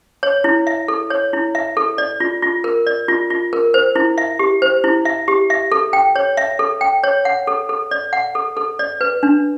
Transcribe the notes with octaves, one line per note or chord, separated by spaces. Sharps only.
C#5
E4
E5
A4
C#5
E4
E5
A4
D5
F4
F4
A#4
D5
F4
F4
A#4
C5
E4
E5
G4
C5
E4
E5
G4
E5
A4
G5
C#5
E5
A4
G5
C#5
F#5
A4
A4
D5
F#5
A4
A4
D5
B4
D4